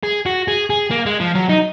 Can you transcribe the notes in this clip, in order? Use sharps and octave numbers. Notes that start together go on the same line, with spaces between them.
G#4
F#4
G#4
G#4
A#3
G#3
F3
F#3
D#4